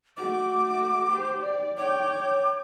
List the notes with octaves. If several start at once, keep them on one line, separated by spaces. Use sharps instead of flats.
A3 F#4 D6
G4 C5
D5
C#5 G5 D6